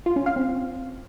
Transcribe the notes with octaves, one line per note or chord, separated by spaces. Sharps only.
F4
C#4
F5
C4